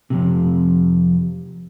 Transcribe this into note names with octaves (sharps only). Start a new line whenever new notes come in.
F2 G#2 C3